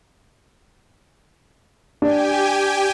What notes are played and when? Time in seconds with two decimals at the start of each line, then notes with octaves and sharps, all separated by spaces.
2.02 D4 G4 G5 G#5